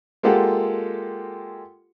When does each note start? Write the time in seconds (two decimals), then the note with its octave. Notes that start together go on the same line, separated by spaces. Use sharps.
0.23 G#3 A#3 F4 G4 A4 F#5